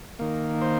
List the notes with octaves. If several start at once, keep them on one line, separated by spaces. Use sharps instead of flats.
D#3 A#3
C5